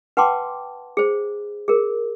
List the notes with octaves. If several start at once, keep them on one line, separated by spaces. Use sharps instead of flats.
B4 F#5 G5 A5 C6 D6
G#4 C5
G#4 A#4